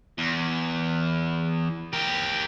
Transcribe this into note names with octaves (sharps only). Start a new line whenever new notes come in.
E2
G4 A#4